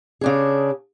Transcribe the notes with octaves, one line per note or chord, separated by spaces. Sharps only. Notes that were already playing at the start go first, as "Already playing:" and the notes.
C#3 D4 G#4